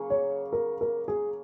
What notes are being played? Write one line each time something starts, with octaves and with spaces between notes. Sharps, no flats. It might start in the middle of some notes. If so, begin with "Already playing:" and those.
Already playing: C#3 F#3 A#3
C#5
A#4
A#4
G#4